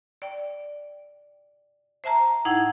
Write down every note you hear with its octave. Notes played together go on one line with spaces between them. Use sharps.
D5 G5
C5 E5 A5 A#5
A2 D#4 E4 F#5 G5 G#6